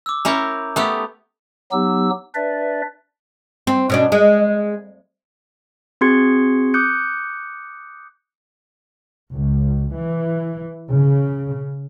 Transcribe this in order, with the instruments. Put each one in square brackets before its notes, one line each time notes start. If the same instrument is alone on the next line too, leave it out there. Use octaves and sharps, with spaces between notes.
[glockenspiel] D6 E6
[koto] C#4 E4 A#4 [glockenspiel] A#5 D6 G6
[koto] A3 B3 G4 [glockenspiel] D#6 F#6 F7
[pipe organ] F#3 B3 D#4 G4 E6
D4 B4 D5 E5
[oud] C4
B2 C#4 D4
G#3
[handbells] C4 F#4 G#4 C6 G#6 C#7
D6 D#6 F#6 G6 C#7
[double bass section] C#2
E3
C#3